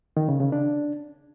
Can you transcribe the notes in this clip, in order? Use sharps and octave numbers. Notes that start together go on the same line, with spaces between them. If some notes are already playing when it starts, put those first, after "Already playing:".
D#3
C#3
C#3
D4